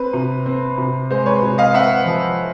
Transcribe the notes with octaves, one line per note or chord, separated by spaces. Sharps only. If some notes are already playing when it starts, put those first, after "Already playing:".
Already playing: C4 B4
C3
C4
C3
G#3 C5
B4 C#5
C3
D#5 F5
C4 E5 F#5
F3